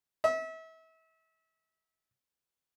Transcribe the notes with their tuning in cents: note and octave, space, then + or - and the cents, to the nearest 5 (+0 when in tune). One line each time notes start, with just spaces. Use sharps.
E5 -35